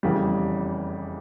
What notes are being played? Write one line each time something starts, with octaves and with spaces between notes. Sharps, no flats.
F1 E2 C#3 E3 G3